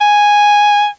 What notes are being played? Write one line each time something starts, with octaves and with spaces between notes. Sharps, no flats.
G#5